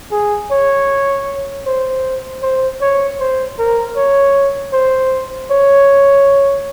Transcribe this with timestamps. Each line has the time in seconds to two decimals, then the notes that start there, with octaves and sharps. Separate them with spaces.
0.12 G#4
0.51 C#5
1.67 C5
2.42 C5
2.82 C#5
3.20 C5
3.59 A#4
3.97 C#5
4.73 C5
5.51 C#5